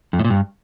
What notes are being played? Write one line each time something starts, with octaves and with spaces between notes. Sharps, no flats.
F2
A2
A#2
G2